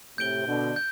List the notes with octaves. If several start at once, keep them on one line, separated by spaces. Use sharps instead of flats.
A2 C3 G6 D7 G7
B2 D3
G6